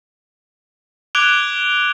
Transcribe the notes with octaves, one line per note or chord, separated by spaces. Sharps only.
D6 F#6 G#6 D7 F7 G7